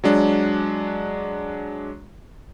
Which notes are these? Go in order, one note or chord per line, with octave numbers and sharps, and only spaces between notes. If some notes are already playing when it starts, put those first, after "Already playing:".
F#3 G#3 D4